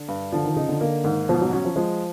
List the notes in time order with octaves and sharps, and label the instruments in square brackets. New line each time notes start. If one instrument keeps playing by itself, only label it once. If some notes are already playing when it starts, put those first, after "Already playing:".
Already playing: [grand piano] D3
[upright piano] G2
[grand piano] D3 [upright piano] F3
[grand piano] D#3
[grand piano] C#3 [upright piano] D#4
[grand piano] D3
[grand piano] D3 [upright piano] A#3
[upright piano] G#2 [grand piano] D#3
[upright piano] B2 [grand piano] F3
[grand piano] F#3
[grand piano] F#3 [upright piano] C#4
[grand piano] F3
[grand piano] F3 [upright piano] G#3